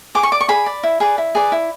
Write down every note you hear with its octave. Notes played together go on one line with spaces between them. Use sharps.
G#4 D6
C#6
D5 D6
C#6
G#4 B5
D5
E4
G#4 B4 D5
E4
G#4 B4 D5
E4